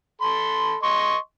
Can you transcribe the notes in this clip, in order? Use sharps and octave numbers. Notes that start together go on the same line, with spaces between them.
A4 B5 C6
D#5 C6 C#6